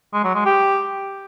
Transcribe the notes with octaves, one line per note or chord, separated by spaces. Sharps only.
G#3
F#3
G#3
G4